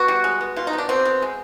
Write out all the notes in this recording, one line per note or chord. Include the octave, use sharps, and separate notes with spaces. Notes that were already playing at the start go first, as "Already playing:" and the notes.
Already playing: B3 F#4
G3
G#3
B3
B2 F4
D#4
B3
D4
B2 C4
B3
G#3